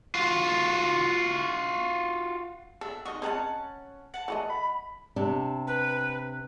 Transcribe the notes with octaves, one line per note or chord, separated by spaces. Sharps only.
F4 F#4
D4 A4 E5
D#3 F#4 D#5 C#6
C4 C#4 D#5 F#5 A5 A#5
F#5 A5
E3 A3 D#5
B5
C3 D4
B4